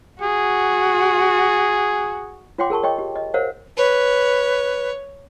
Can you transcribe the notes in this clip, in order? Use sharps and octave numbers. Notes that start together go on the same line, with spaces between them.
F#4 G#4
F4 C#5 F#5 G5 C6 D6
G#4 A#4 A5 C#6
C#5 D#5 G5 C#6
G4
D#5
A#4 C5 C#5 F5 F#5
B4 C#5